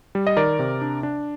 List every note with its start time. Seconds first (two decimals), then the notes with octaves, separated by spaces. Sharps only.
0.15 G3
0.27 D#5
0.37 D#3 A#4 D5
0.59 C3
0.82 D4
1.03 D4